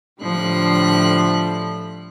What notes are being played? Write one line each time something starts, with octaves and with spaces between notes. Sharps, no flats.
A2 D3 F3 G3 B5 F#6